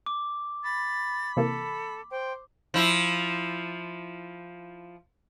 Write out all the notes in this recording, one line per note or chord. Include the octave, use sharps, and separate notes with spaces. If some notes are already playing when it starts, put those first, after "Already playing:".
D6
B5 A6
C3 E3 A#3 A4
C5 G5
F3 E4